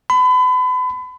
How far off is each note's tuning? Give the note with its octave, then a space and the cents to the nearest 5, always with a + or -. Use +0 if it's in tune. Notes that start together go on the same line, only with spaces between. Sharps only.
B5 +35